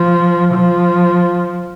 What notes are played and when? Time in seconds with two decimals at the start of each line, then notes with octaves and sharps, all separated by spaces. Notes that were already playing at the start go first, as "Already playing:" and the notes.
Already playing: F3
0.54 F3